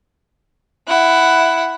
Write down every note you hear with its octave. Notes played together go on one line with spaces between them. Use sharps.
E4 F#5